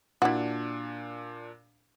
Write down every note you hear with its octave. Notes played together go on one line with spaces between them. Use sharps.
A#2 D4 E4 F#4